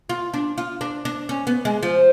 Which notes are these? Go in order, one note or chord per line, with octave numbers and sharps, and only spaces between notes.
F4
D4
F4
D4
D4
C#4
B3
G#3
F3